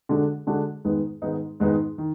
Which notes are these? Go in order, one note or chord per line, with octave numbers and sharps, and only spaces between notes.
D3 G#3 D4 F#4
D3 G#3 D4 F#4
G#2 D#3 G#3 B3 D#4
G#2 D#3 G#3 B3 D#4
G#2 D#3 G#3 B3 D#4
D#3